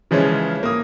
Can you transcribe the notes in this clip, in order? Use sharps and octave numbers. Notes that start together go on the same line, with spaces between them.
C#3 E3 F3 G#3 C#4
A#3 D#6